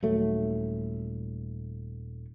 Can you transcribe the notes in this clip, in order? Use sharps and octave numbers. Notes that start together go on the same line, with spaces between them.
D#1 F#3 A3